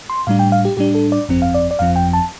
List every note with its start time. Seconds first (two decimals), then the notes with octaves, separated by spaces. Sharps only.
0.10 C6
0.27 A2 G3 D4 F5
0.39 G5
0.52 F5
0.65 G4
0.77 A2 G3 D4 G4
0.95 A4
1.12 D5
1.29 G1 F2 F3 C4
1.42 F5
1.54 D5
1.71 D5
1.79 G1 F2 F3 C4 F5
1.96 G5
2.13 A5